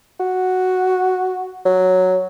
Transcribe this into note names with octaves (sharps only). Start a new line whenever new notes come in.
F#4
F#3